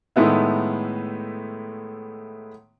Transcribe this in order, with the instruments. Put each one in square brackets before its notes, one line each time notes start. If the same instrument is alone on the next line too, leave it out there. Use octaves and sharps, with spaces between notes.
[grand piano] A2 D#3 G#3 A3 B3 E4